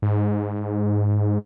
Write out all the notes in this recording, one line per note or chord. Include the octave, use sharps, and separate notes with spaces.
G#2